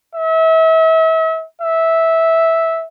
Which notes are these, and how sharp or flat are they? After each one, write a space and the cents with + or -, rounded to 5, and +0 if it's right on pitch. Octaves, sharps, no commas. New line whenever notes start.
E5 -35
E5 -10